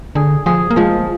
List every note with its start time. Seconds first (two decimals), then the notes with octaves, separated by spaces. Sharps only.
0.15 D3 G#4
0.46 F3 G#4
0.71 A#3
0.76 F3 G#3